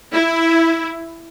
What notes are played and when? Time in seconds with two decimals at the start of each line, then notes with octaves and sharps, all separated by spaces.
0.13 E4